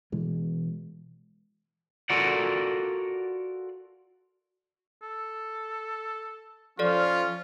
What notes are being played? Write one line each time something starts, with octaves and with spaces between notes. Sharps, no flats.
B2 E3 G#3
F4 F#4 A4 A#4 D5 F#5
A4
F3 C#4 F4 A4 D5